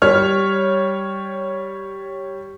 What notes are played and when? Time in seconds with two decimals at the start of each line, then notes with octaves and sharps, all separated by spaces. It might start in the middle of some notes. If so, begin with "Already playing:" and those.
0.02 G3 C#5 F6